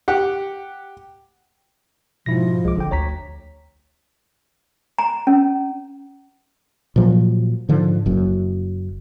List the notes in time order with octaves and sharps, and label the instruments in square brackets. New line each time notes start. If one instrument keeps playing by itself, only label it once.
[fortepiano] G4 F#5
[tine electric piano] G#2 E4 A#6 [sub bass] B2 [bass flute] F3
[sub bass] C2 [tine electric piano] G#3 D6
[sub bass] G#1 [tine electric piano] D3 G5
[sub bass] D2 [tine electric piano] C#5 A#5 B6
[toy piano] A#5
C#4
[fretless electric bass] A#2 F3 F#3
G#2 D3 F3
F#1 F#2